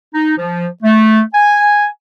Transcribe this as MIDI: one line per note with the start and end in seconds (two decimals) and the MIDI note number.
0.14 0.33 63
0.37 0.67 53
0.83 1.21 57
1.33 1.86 80